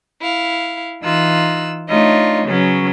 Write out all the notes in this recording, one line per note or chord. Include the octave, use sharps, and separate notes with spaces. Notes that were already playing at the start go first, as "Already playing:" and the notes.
E4 F5
E3 D#4 F4 E6 F#6
A3 D4 D#4 F4 C#5 D#5
C#3 F#3 B3 C#4